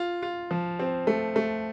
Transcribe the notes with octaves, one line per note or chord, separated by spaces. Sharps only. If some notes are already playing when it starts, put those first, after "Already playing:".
Already playing: F4
F4
F3
C4
A3
A3